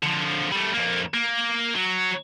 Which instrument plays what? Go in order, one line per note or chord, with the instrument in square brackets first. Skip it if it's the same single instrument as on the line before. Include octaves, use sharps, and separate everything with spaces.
[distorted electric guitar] D3 F3
G3 A3
F2 A#3
A#3
F#3